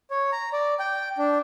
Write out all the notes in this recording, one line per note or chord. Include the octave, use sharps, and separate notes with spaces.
C#5
A#5
D5
G5
D4